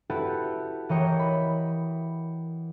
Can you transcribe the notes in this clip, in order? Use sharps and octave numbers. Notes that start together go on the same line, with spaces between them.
E4 F#4 G4 A4 B4
E3 A#4 C#5 D#5 G5 C#7
B5